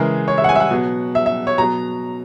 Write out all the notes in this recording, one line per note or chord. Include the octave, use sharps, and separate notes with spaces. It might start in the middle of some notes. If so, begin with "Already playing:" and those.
Already playing: C#3 E3 G#3 A#4
C#5
E5
F#5
G#5
E5
F#5
B2 F#3
E5
E5
C#5
B2 F#3 A#5